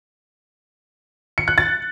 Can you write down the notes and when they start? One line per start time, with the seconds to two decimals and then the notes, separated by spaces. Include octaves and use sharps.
1.38 C#7
1.48 F#6
1.58 A6